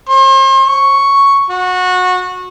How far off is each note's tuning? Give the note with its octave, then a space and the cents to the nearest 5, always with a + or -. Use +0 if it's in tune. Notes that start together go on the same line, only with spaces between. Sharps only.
C5 +40
C#6 +0
F#4 -20